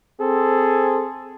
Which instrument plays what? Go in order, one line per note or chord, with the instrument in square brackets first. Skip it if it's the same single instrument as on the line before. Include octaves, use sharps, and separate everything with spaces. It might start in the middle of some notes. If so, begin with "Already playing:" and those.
[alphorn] C4 [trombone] G#4 [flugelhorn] A4